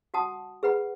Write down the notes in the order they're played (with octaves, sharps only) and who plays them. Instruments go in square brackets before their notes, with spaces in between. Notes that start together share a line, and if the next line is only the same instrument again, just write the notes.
[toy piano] F#4 F#5 A5 D#6
G#4 B4 F#5 B5